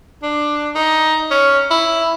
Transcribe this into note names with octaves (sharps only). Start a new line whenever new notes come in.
D4
D#4
C#4
E4